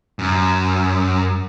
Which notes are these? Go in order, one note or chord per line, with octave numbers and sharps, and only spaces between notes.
F#2